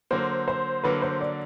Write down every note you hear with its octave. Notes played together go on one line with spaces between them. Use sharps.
D3 F#3 A#3 C5
C5
D3 F#3 A#3 B4
C5
D5